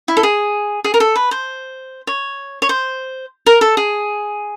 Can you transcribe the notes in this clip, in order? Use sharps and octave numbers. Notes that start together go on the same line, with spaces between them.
E4
A4
G#4
G#4
A#4
A4
B4
C5
C#5
C#5
C5
A#4
A4
G#4